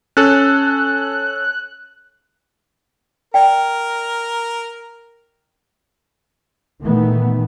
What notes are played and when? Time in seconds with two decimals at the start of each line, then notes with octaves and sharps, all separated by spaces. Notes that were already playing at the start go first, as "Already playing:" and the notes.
0.17 C#4 A4 F#6
3.34 A#4 D5 G5
6.83 A#2 D#3 E3 A3 B3